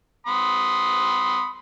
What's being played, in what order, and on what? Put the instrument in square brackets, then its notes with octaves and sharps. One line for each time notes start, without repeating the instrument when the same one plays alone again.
[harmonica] B5 C6 D#6